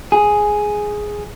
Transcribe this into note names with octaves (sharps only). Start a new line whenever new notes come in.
G#4